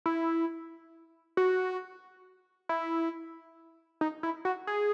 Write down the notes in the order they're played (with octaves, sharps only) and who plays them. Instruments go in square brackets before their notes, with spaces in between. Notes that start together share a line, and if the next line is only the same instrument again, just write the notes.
[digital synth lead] E4
F#4
E4
D#4
E4
F#4
G#4